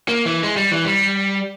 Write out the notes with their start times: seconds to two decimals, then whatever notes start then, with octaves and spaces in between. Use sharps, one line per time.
0.08 A#3
0.26 E3
0.43 G#3
0.57 G3
0.71 E3
0.85 G3